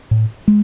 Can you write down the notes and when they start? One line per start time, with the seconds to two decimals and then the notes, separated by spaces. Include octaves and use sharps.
0.11 A2
0.48 G#3